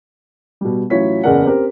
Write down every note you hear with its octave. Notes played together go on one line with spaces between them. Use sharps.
B2 G3
A1 F#3 E4 F4 C#5 B6
F#1 E2 G#4 A#4 D5 F#5
C4 G4 A#4